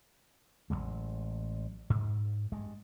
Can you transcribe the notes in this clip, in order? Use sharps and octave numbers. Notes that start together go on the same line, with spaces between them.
A1 D#3 F#3 G#3
G#2
G2 G#3